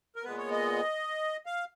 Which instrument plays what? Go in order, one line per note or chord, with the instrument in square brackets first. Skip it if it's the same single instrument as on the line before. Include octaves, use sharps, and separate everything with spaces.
[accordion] A#4
A#2 G#3 B3 B4
C#5
D#5
F5